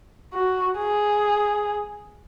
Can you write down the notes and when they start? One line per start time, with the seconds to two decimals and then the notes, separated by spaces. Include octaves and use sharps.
0.33 F#4
0.78 G#4